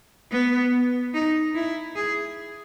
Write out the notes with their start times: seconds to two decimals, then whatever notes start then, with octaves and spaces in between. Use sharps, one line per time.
0.32 B3
1.14 D#4
1.55 E4
1.96 G#4